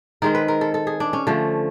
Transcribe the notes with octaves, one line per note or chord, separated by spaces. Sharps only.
D#3 G#3 C4 A#4
B4
A#4
A4
A4
G#4
D4
C#4
D3 F3 A3